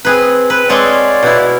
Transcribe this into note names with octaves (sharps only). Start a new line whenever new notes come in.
C4 G#4 B4
B4
G#3 C4 A4 C#5 D5 F5
B2 E4